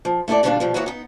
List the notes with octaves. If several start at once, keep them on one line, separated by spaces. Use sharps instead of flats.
F3
A3 E4 G4 A4 D5
B2 D3 G3 C#4 D4 F4
B2 F3 G3
E3 A#3 B3 E4 F#4 C#5
B3 D#4